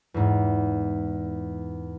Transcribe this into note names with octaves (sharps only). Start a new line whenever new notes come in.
E2 G#2